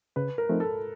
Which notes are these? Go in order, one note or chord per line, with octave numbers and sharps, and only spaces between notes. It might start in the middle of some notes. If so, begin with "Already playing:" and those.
C#3 B4
A#4
F3 A3 C4 D#4
A4